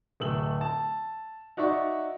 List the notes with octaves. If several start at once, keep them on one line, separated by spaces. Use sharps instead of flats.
D1 A3 E6 F#7
A5
D#4 F#4 D5 E5 C#6